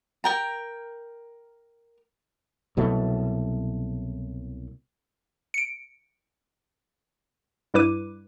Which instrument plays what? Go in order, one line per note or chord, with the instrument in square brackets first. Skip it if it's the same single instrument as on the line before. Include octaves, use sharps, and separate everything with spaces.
[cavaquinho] A#4 G5 A#5
[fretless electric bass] C2 B2 F#3 A3
[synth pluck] C#7 D7
G2 G3 E4 B4 D6 D#7